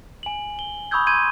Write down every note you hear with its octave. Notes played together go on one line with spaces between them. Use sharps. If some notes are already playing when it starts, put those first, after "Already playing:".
G#5 F#7
G7
B5 C#6 D#6 E6 G6 G#6
C6 G6 G#6 D#7